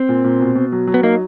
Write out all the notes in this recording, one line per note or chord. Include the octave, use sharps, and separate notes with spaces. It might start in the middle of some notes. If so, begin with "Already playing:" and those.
Already playing: C4
A#2
A#2
B2
B2
F#3
F#3
B3
A#3 D#4